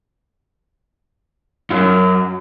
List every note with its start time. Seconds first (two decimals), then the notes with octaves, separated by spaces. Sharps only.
1.70 F#2